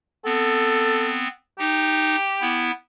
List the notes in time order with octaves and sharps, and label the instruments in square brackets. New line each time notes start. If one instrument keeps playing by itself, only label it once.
[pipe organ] B3 C4 [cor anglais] A4
[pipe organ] D#4 [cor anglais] G4
[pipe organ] B3 E4